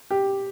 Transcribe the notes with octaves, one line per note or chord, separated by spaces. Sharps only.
G4